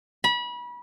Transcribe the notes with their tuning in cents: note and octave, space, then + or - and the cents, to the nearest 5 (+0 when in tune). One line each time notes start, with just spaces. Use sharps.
B5 -30